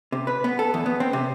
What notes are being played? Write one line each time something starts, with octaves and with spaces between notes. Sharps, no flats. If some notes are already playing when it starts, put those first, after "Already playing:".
C3
B4
B3
A4
E2
B3
C4
C3